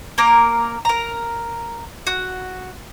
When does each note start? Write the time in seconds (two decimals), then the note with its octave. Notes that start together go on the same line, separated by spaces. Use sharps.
0.18 A#3 A#4
0.85 A#4 A#5
2.07 F#4